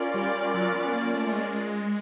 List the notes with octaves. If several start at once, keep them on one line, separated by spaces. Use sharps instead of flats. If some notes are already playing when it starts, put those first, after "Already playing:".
Already playing: C#4 F4 A#4 D5
G3
F#3
B3
A#3
A3
A3
G#3